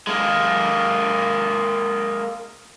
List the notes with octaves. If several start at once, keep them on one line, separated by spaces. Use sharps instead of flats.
G#3 A#3